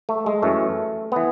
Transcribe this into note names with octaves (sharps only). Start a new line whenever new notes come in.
A3
G#3
F#2 E3 A3
E3 B3